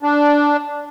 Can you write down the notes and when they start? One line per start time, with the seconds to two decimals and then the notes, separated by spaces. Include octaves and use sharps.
0.03 D4